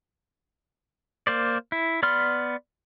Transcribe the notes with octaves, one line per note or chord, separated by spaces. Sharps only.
A#3 C5 D5
E4
B3 D5 B5 C6 F6